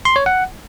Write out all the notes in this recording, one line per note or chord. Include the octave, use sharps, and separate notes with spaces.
C6
C#5
F#5